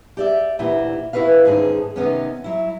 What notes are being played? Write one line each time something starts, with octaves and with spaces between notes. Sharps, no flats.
G4 D5 E5
D2 A#2 E3 E4 F#4 G4
B2 E4 F#4 A#4 B4 F5
D#2 G#2 D3 D#3 C#4 G#4
C3 D#3 E3 B3 C#4
F#3 E4